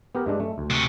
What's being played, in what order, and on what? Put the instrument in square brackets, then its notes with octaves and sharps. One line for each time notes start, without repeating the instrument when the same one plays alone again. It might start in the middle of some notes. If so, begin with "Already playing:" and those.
[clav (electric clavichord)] B3 G4 A#4
G2 G#3 D4
A3
D2
[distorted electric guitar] C3 C#4